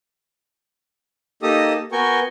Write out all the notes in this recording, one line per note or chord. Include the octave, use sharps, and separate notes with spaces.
A#3 D#4 G4 A4 D#6
B3 F#4 A#4 G5 G#5 C#6